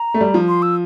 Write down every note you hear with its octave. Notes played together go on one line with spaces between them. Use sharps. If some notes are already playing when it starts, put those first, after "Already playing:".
Already playing: A#5
A3
G3
F3
C6
E6